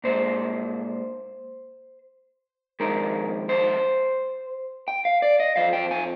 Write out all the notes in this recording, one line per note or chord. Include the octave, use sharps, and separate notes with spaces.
A#2 G#3 C5
F2 D#3 G#3 A#4
C5
G5
F5
D5
D#5
F2 C3 F3 F5
G5
G#5